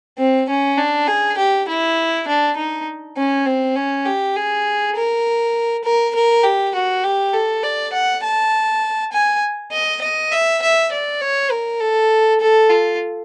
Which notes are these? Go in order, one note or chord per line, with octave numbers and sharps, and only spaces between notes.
C4
C#4
D4
G#4
G4
E4
D4
D#4
C#4
C4
C#4
G4
G#4
A#4
A#4
A#4
G4
F#4
G4
A4
D5
F#5
A5
G#5
D#5
D#5
E5
E5
D5
C#5
A#4
A4
A4
F4